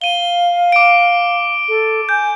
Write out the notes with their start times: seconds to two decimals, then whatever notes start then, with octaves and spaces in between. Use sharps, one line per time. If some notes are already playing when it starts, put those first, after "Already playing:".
0.01 F5 D#7 G7
0.72 D6 D7
1.68 A4
2.09 G#5 G6